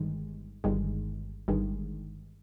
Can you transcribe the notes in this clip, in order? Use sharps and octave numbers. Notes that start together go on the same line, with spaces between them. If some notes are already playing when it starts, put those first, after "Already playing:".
Already playing: G1 G2 D#3 G#3
G1 G2 D#3 G#3
G1 G2 D#3 G#3